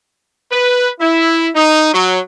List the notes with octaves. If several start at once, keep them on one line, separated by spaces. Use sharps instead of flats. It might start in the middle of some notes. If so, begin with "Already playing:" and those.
B4
E4
D#4
F#3